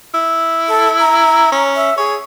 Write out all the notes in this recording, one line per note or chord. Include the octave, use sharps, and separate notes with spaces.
E4
A4
A#5
C#4
E5
G#4 C#5